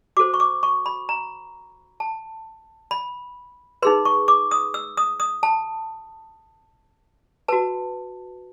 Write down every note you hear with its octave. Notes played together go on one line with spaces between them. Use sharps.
F#4 A4 C5 D6
C#6
D6
C#6
B5
A#5
A5
B5
D#4 G#4 B4 C6
C#6
D6
D#6
E6
D#6
D#6
A5
F#4 B4 A5